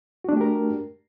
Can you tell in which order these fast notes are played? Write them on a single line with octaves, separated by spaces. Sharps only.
F#4 D4 A3 G4 A#4